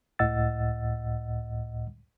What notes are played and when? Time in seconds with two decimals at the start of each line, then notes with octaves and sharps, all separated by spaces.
0.19 C#2 A2 D#5 F#5 E6 A6